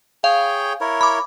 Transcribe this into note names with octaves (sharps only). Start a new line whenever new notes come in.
G#4 C#5 F5 G5
E4 A#4 C#5
B5 D6